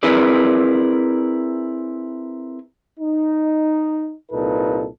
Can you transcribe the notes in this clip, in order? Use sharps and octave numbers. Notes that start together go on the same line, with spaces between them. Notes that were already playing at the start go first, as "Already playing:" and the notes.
C4 E4 G#4 A#4 B4 D5
D#4
C2 A#2 D#4 A4 B4